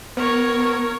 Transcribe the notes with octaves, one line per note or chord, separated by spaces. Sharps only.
B3 A#4 C#5